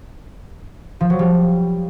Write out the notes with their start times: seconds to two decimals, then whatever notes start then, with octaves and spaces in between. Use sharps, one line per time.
1.01 F3
1.10 F#3
1.19 G3